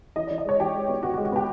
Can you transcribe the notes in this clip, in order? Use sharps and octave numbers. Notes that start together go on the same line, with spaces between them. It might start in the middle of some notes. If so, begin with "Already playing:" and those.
E3 D#5
D5
E3
D#5
G#3 C#5
E3 G4
G#3
B3
B3 F#4
F#4
G#3
F#4
B3 G4